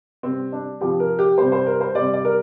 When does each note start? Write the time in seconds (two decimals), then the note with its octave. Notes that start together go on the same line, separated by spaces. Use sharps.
0.23 C3 G3 C4
0.52 D4
0.81 C3 F3 G4
1.00 A#4
1.19 G4
1.38 C3 G3 C5
1.52 C5
1.66 A#4
1.81 C5
1.95 C3 G3 D5
2.14 D5
2.25 A#4